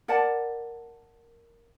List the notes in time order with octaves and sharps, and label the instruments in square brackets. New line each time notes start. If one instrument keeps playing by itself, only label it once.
[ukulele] A#4 D5 F#5 A5